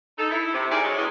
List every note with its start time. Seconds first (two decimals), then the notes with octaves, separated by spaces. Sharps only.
0.18 D#4 A4
0.31 E4
0.54 C3
0.71 D#4 G4 G#4 A#4 D5 E5
0.83 F#3 G#3
0.97 A2 A3 B3 C#4 D4 D#5